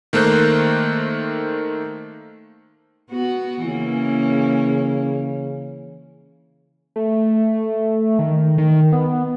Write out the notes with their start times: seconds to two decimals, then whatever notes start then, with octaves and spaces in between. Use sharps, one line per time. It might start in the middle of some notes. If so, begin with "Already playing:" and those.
0.13 D#3 A3 A#3 C5 F#6 G6
3.10 B3 F#4
3.65 C#3 E3 A#3 C#4
6.96 A3
8.19 D#3
8.58 D#3
8.92 B3